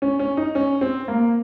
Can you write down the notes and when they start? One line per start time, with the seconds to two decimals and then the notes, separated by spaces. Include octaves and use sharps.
0.02 C#4
0.19 C#4
0.37 D#4
0.55 C#4
0.81 C4
1.08 A#3